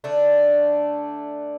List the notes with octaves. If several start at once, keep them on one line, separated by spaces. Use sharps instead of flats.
D3 A3 D4